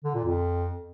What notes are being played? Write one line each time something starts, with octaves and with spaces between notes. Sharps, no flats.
D3
A#2
F2